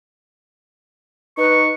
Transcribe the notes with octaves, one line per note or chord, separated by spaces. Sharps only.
D#4 B4 C#6